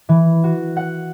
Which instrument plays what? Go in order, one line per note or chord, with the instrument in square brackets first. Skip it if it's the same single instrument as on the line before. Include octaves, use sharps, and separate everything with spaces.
[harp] E3
F#4
F#5